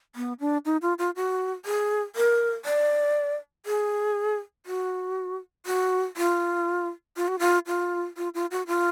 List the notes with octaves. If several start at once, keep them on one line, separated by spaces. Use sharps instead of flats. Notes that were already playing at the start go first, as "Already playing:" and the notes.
B3
D4
D#4
F4
F4
F#4
G#4
A#4
D5
G#4
F#4
F#4
F4
F4
F#4
F4
F4
F4
F4
F#4
F4